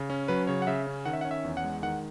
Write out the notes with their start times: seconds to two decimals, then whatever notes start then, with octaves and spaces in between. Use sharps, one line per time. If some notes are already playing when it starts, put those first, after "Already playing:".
Already playing: C#3
0.10 C#4
0.28 F#3 B4
0.47 C#3 C#5
0.62 F#5
0.67 C#3 E5
0.87 C#4
1.05 D#3 F#5
1.13 E5
1.21 F#5
1.25 C#4
1.31 E5
1.44 E2
1.57 F#5
1.64 G#3
1.83 D#3 F#5